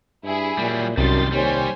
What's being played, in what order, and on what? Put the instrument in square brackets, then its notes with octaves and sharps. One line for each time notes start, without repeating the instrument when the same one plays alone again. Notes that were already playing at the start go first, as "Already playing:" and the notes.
[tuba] G2 [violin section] E4 G#4
[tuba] A#2 [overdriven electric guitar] F#3 G3
[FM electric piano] C2 [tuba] F#2 [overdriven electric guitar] D#3 G3 [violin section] C6 A6
[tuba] D#2 [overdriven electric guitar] G3 [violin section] C5 C#5 G#5